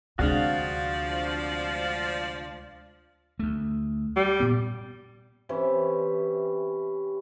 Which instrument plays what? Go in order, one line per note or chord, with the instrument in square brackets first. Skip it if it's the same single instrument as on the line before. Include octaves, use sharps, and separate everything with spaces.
[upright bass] D2 [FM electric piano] C3 G#3 D4 [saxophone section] F3 D5 [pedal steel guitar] F#4 F5
[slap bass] D2 A3
[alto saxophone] G3
[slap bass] A#2 B3
[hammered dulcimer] C3 E3 C#4